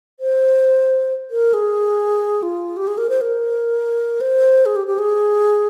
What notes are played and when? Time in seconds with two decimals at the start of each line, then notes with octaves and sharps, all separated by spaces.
0.20 C5
1.31 A#4
1.53 G#4
2.42 F4
2.77 G4
2.87 G#4
2.98 A#4
3.09 C5
3.21 A#4
4.21 C5
4.65 G#4
4.76 G4
4.87 G4
4.98 G#4